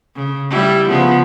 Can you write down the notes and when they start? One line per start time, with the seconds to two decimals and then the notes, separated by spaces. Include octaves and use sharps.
0.16 C#3
0.50 G3 E4
0.89 C#3 F3 B3